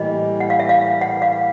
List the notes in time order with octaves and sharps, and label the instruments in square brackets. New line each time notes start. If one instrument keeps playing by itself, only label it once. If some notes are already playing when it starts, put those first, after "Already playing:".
Already playing: [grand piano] A2 E3 G3 A#3 [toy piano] D#5
[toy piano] F#5
F5
E5
F5
F#5
F5